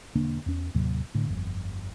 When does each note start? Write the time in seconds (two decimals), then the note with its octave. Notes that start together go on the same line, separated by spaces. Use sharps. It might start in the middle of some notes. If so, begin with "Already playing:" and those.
0.15 E1 D3 A#3 D4
0.46 E2 C#4
0.74 D#2 A2 C3 F#3
1.15 A2 D3
1.29 G1 F2